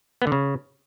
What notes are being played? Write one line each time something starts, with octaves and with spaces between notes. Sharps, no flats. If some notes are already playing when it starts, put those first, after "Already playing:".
B3
D3
C#3